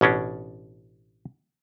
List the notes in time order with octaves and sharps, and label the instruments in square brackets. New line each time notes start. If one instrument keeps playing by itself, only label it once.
[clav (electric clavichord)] A1 B2 C#4 D4